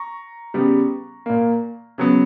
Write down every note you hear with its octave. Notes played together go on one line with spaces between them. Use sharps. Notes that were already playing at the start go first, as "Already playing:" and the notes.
Already playing: A#5 C#6
C#3 G3 B3
A#2 A#3
C#3 F#3 B3